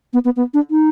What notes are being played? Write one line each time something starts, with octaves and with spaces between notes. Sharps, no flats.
B3
B3
B3
D4
D#4